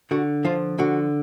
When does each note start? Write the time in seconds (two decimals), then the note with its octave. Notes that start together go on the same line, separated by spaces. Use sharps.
0.11 D3 F#4
0.45 F3 F4
0.78 D3 F#4